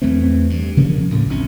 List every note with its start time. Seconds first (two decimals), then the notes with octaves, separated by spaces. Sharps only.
0.02 E2 E3 A3 C4
0.50 G2
0.77 C#3 F3 A#3 C#4
1.10 D2 A2 C#3
1.29 A#1 F2 C#4